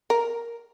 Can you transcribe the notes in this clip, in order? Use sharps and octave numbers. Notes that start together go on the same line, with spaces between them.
A#4